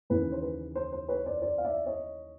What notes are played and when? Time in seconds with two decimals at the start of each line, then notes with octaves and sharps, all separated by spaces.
0.10 D#2 C#3 E3 B4
0.32 C5
0.42 B4
0.75 C5
0.92 C5
1.08 B4 C#5
1.25 C5 D5
1.42 C5 D5
1.58 F5
1.64 D5 E5
1.86 C#5 D#5